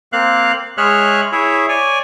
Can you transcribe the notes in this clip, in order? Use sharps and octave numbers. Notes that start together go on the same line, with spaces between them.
A#3 C4 F5 F#6
G#3 G#4 C#5 E5 F6 F#6
E4 G#4 C#5 E5
C#5 D5 G#5